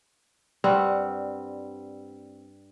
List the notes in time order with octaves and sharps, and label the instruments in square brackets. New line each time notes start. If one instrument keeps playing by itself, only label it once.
[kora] G2 G3 C4 F#5